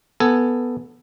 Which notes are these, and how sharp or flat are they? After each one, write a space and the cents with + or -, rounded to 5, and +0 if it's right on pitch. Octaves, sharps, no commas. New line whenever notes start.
B3 +0 A4 +5 G#5 +0